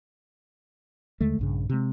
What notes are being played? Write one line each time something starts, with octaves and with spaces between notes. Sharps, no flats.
D#2 D3 G#3 A3
A#1 G2 C#3
C3 G#3